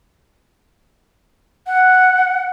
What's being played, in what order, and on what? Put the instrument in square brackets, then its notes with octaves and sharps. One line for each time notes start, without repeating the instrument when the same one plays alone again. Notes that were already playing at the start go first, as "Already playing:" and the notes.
[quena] F#5